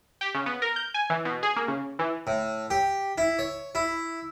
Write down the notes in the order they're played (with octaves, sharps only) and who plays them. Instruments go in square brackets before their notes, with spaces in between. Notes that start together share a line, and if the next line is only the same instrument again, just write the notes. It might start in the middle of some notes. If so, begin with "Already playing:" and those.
[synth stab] G4
C#3
B3
A#4
G6
G#5
E3
B2
G#4
A#3
C#3
E3
[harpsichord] A2
G4
E4
C#5
E4